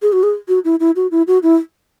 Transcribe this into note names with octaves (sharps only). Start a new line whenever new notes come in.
G#4
F#4
G#4
F#4
E4
E4
F#4
E4
F#4
E4